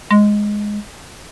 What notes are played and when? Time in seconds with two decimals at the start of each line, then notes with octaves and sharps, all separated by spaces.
0.11 G#3